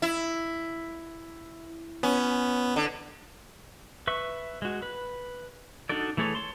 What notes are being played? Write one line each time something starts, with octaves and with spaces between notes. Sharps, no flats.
E4
B3 C#4
D3
B4 E5 C#6
G#3 F#4
B4
D4 D#4 F#4 A4 D5
E3 A3 G#4 A4 C#5
C#5 A5 C6